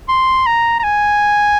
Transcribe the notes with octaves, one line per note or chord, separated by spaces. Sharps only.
C6
A#5
A#5
G#5